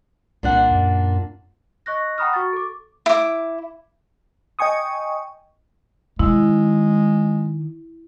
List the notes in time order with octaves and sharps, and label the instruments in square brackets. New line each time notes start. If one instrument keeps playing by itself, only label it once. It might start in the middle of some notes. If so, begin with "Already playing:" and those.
[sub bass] C2 [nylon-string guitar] A#2 D4 F#5
[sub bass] F#2
[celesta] D#5 C#6 F#6 A#6
F#5 G5 A#5 B5 D#6 F6
F#4 C#6 A6
A4 D6
[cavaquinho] E4 D6
[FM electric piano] D#5 G5 G#5 C#6 D#6
[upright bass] D#3 [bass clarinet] G#3 [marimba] E4